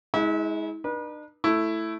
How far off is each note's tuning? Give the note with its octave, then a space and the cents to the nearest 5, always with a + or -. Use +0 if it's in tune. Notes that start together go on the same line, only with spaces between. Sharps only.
G#3 +15 E4 -40
D4 +45 B4 -40
A3 +0 E4 +0